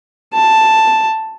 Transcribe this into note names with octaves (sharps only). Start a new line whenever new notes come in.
A5